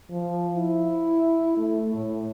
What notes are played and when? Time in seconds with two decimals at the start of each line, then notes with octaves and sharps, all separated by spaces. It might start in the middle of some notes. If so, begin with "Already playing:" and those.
0.10 F3
0.56 E4
1.58 A3
1.94 A2